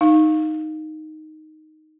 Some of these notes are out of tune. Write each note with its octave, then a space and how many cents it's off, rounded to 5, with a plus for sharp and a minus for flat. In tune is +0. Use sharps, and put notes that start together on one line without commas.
D#4 +0 F5 +0